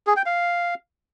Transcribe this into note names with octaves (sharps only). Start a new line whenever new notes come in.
G#4
G5
F5